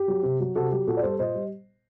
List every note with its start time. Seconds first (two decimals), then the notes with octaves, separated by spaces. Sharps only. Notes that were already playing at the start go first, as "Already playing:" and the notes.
Already playing: G4
0.08 F#3
0.23 C3
0.40 F#3
0.55 C3 F#4 A4
0.72 F#3 G4
0.87 A#2 F#4 A4
0.97 D5
1.02 G3 A4 C5
1.19 A#2 C5 D#5
1.34 G3